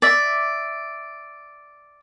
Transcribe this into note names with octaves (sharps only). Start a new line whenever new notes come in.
D5 E5